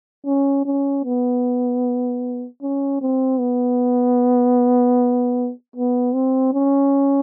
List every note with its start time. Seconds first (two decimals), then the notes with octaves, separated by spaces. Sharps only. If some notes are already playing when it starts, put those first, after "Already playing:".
0.26 C#4
0.65 C#4
1.04 B3
2.62 C#4
3.01 C4
3.39 B3
5.76 B3
6.14 C4
6.53 C#4